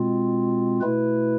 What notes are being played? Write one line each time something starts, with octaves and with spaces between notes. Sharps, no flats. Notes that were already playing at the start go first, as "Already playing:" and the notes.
Already playing: B2 G#3 C4 F4
B2 A3 E4 B4